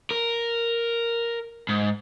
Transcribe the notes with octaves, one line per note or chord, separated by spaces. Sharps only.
A#4
G#2